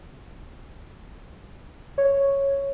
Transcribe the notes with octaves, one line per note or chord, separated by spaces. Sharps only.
C#5